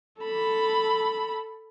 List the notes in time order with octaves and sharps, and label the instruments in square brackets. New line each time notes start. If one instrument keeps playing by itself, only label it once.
[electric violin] A4 B5